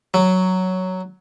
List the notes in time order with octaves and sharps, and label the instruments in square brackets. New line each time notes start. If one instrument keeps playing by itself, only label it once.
[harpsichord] F#3